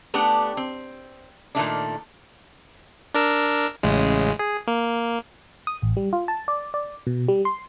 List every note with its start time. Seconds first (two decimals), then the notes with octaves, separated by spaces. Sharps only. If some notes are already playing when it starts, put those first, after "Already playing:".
0.14 A3 B3 D4 G4
0.57 C4
1.55 A#2 D#3 A3 D4
3.14 D4 A#4 E6
3.83 A1 C#3 G#3
4.39 G#4
4.67 A#3
5.67 D#6
5.82 A1
5.97 G3
6.13 F4
6.28 A5
6.48 D5
6.74 D5
7.07 B2
7.28 G3
7.45 C6